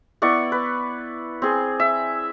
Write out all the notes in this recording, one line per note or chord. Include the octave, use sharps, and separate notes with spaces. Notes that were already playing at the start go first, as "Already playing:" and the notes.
B3 E4 D5 C#6
B4
C4 G#4
E5